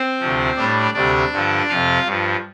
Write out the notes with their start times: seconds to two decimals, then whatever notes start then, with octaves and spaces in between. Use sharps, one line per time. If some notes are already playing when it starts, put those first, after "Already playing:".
Already playing: C4 C5
0.20 D2 C3 F3
0.57 A2 G3 D4 D5
0.94 D2 C3 G3 D4 D5
1.32 G2 D3 F3
1.69 F2 C3 F3 F4 F5
2.06 G2 F3